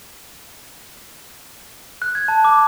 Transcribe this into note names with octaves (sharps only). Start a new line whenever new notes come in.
F#6
G#6
A5
D6